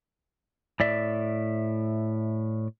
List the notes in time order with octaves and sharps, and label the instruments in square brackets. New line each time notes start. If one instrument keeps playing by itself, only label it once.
[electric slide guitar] A2 D5 E5